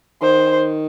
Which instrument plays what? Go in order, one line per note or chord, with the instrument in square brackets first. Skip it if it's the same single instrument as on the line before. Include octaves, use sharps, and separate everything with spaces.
[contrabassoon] D#3 [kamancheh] C5